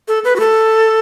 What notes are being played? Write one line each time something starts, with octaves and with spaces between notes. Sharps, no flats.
A4
B4
F#4
A4